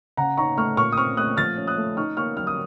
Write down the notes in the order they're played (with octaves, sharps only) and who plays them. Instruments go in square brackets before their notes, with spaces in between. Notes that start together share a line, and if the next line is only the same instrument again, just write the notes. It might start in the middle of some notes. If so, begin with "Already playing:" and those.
[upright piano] C#3 F#5 A#5
D#4 A#5 C#6
A3 C#6 F6
A#2 C#6 F6
D#6
C4 C#6 F6
A3 D#6 F#6
F3 F6 A6
C#4
D#6 F#6
A3
D#4 C#6 F6
A#3 C#6 F6
F#3 F6
D#6